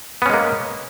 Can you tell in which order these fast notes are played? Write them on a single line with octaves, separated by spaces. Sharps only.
B3 C#4 G#3 A#3